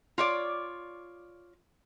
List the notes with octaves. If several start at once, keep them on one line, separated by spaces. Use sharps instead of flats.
F4 C#5 D5